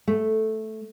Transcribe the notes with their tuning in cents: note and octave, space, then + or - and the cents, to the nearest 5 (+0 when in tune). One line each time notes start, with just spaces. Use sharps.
A3 -5